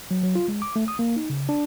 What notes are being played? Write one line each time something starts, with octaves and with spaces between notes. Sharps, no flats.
F#3
F#3
F4
G#3
D6
A3
D#6
A#3
D#4
C#3
D4